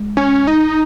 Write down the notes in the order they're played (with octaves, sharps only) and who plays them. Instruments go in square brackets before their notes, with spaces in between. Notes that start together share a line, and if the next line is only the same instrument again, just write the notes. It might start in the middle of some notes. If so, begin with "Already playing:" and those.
Already playing: [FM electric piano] G#3
[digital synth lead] C#4
D#4